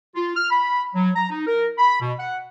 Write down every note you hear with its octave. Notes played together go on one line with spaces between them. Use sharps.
F4
F6
B5
F#3
A#5
D#4
A#4
B5
B2
F#5